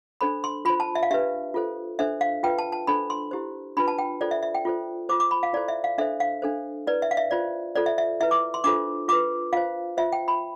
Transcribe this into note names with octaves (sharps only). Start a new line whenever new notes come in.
D4 A4 C5 B5
C6
F4 C5 B5
A5
E5
F5
D4 G4 B4 E5
F4 A4 C5
D4 A4 C5 E5
F5
F4 B4 G5
A5
A5
D4 A4 C5 B5
C6
E4 G4 C5
D4 F4 B4 B5
A5
G5
F4 A4 C5 D5
E5
E5
G5
F4 A4 C5
F4 C5 D6
D6
B5
F5
E4 A4 C5 D5
E5
F5
D4 A4 C5 E5
F5
D4 A4 C5
E4 B4 D5
E5
F5
E5
F4 C5 D5
F4 A4 C5 D5
E5
E5
E4 B4 E5
D6
C6
D4 F4 A4 C5 D6
F4 B4 D6
F4 C5 F5
F4 C5 E5
G5
B5